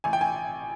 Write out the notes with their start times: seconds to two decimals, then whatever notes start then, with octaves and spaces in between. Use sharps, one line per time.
0.04 A1 G#5
0.13 G5
0.21 G#5